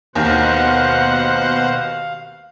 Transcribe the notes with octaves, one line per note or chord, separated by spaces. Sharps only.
D#2 B2 D#3 C5 F5 F#5